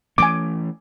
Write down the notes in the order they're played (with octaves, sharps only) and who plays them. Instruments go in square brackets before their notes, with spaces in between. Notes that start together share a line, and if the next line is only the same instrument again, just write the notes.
[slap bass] E3 A3 C#4 [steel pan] G#5 D6